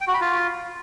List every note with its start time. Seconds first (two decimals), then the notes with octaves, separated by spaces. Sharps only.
0.01 G5
0.07 F#4
0.14 B5
0.21 F4